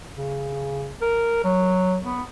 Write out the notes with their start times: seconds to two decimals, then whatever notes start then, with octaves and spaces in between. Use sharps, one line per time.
0.14 C#3
1.01 A#4
1.44 F#3
2.03 B3